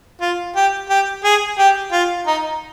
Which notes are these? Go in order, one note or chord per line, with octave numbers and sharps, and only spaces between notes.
F4
G4
G4
G#4
G4
F4
D#4